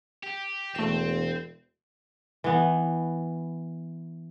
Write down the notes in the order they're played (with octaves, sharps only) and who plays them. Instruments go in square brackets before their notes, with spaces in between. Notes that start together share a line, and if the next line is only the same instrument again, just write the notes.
[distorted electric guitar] G4
[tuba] E1 [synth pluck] A3 E7 [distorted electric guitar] C4
[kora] E3 B3